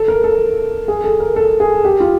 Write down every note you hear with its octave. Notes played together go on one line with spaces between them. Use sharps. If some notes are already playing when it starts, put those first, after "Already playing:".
Already playing: A4
A#4
A4
G#4
A4
A#4
A4
G#4
G4
F4